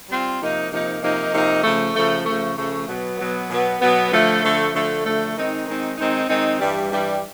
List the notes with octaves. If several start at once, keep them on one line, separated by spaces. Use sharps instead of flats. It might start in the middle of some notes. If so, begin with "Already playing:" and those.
G3 C4 F4
C3 F3 A#3 D#4
C3 F3 A#3 D#4
C3 F3 A#3 D#4
C3 F3 A#3 D#4
C#3 F3 A3
C#3 F3 A3
C#3 F3 A3
C#3 F3 A3
B2 F#3 B3
B2 F#3 B3
B2 F#3 B3
B2 F#3 B3
D3 F3 A3
D3 F3 A3
D3 F3 A3
D3 F3 A3
D#3 G#3 C4 D#4
D#3 G#3 C4 D#4
D#3 G#3 C4 D#4
D#3 G#3 C4 D#4
G2 E3 G3
G2 E3 G3